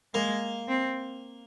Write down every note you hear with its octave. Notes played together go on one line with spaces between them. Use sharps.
G#3 A#3
C4